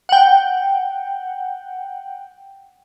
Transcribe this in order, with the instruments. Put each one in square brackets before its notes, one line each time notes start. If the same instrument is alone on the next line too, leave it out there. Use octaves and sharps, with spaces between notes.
[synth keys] F#5 G5